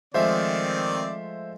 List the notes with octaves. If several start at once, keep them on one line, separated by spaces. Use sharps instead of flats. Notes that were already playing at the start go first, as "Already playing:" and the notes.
D#3 F3 G#3 A3 C4 C5 D5 E5